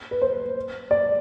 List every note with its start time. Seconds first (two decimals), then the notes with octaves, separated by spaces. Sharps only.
0.11 B4
0.22 C5
0.91 D5